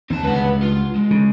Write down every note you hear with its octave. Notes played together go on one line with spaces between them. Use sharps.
D#2 C4 A5
C#2 G2 B4 F#5
F4
G#3
C#3